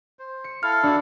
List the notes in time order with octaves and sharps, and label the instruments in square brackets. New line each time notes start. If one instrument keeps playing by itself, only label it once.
[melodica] C5
[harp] C#7
[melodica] E4 A4 F5 [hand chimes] F6
[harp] D4 F#4